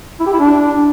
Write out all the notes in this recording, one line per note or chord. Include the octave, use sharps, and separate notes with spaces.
E4
G4
E4
D4